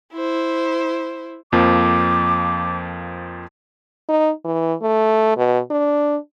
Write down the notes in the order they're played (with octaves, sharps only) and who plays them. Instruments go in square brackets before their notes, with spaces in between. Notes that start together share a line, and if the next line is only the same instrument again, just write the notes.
[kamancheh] E4 C5
[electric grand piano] F2 F3 A#3 [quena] D6
[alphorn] D#4
E3
A3
B2
D4